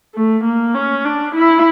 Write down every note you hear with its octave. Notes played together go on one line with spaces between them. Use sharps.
A3
A#3
C#4
D4
E4